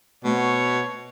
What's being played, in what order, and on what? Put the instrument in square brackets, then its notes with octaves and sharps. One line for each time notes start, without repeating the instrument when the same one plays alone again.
[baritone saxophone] B2 [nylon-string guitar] A3 C4 F#5 [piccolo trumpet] C#5